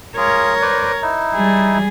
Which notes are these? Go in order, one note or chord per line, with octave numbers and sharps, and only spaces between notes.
F4 G#4 A#4 C#5
B4 C5 D5
D#4 E4
G3 G#4